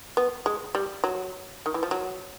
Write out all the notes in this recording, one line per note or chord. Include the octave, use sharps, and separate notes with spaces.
B3
G#3
G3
F#3
D#3
E3
F3
F#3